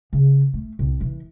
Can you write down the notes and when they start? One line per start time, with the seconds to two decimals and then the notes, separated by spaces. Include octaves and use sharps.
0.13 C#3
0.53 A3
0.79 C2
1.01 E3